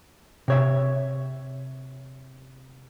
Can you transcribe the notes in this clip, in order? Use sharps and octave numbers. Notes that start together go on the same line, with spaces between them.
C3 C#5 E5